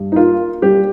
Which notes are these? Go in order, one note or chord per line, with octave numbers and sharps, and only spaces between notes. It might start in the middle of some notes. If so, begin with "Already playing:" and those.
Already playing: G2
D#4
A#3 F4
G3 G4